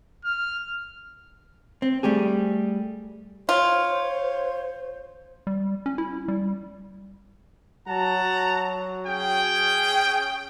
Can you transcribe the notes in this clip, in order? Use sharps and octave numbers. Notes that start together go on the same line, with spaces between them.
F6
C4
G3 A3 G4 G#4
F4 C5 C#5
G3
C#4
E4
G3
F#3 F#5 A5 A#5
C#4 G#4 G5